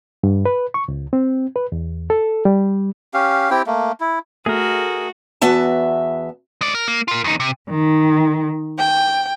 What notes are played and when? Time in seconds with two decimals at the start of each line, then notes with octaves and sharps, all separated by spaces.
0.23 G2
0.46 B4
0.74 C#6
0.88 C#2
1.13 C4
1.56 B4
1.72 E2
2.10 A4
2.45 G3
3.14 C#4 G4 F5
3.50 C4 E4 G4 G5
3.67 A3 A#3
4.00 E4
4.46 A3 F#4 G#4 A#4
5.41 E2 B3 F#4 E5 A5
6.61 G#3 D5
6.75 A#4
6.88 A#3
7.08 F4 A#4
7.24 E2 D#4
7.40 C3
7.70 D#3
8.78 G5